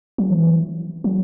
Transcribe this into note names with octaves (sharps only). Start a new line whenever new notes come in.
F#3
E3
F#3